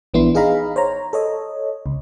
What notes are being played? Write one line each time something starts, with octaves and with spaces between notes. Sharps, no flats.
A#1 E3 B3 D4 E4 C6
D#4 G#4 D#5 F5 A#5 B5
C5 C#5 A#5
A4 C#5 D#5
C#2